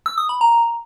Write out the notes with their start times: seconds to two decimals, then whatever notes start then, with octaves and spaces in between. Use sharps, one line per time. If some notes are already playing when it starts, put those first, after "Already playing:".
0.06 E6
0.18 D#6
0.29 B5
0.41 A#5